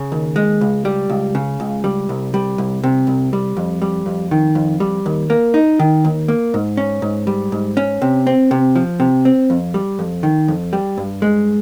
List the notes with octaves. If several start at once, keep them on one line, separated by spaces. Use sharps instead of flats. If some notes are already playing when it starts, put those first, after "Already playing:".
Already playing: C#3
D#2
G#3
C#2
G3
C#2
C#3
C#2
G3
C2
G3
C2
C3
C2
G3
F2
G3
F2
D#3
F2
G3
D#2
A#3
D#4
D#3
D#2
A#3
G#2
C#4
G#2
G3
G#2
C#4
C3
C4
C3
F3
C3
C4
F2
G3
F2
D#3
F2
G3
G2
G#3